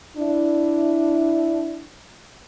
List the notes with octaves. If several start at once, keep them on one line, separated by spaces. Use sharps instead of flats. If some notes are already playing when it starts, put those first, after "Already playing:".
D4 E4